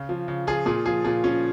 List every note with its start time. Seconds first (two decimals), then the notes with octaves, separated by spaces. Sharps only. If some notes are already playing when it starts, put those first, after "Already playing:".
Already playing: C#3
0.09 F3
0.28 C#3
0.47 F3 F4 G#4
0.66 A#2 F4 G#4
0.85 F3 F4 G#4
1.04 A#2 F4 G#4
1.24 F3 C#4 F4